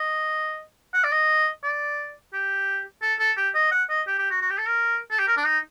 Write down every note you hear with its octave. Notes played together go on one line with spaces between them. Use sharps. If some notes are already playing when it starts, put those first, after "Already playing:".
Already playing: D#5
F#5
D5
D#5
D5
G4
A4
A4
G4
D#5
F#5
D#5
G4
G4
F#4
F#4
G4
A4
A#4
A4
G4
A#4
D4
D#4